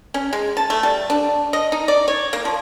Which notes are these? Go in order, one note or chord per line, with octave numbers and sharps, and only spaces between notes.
C#4
G#3
A5
A3
G3
D4
D#5
D#4
D5
C#5
A#3
F3